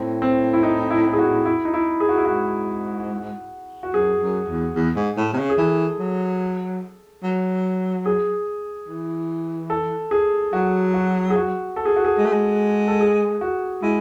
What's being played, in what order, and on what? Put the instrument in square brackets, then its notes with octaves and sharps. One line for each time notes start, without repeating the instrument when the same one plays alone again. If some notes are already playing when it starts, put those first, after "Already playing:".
Already playing: [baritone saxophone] A2 [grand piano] C4
[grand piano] C4
E4
D#4
E4
G#4
F#4
E4
D#4
E4
G#4
F#4
E4
[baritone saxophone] G#2 [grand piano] F#4
[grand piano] F#4
[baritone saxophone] F#2 [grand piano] G#4
[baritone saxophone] F#2
E2
E2
G#2
A2
C3
C#3
[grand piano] G#4
[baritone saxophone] E3 [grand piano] A4
[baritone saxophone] F#3
F#3
[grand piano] G#4
[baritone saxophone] E3
[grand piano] A4
G#4
[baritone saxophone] F#3 [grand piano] F#4
[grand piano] F#4
G#4
F#4
A4
G#4
F#4
G#4
[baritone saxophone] G#3
A3
G#3
[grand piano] A4
G#4
F#4
[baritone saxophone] G#3 [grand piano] E4